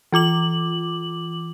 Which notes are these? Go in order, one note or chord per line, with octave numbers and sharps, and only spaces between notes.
E3 F4 D6 F#7